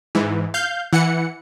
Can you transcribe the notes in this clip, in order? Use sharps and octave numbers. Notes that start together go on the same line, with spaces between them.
G#2 E3
F5 G6
E3 F#5 C#7